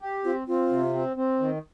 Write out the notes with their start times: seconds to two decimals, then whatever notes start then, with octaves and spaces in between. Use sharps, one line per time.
0.02 G4
0.24 C4 F4
0.47 C4 F4
0.71 C3
0.93 C4
1.17 C4
1.40 D#3